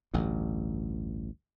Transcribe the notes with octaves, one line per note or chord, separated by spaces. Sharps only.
A1 D2 G2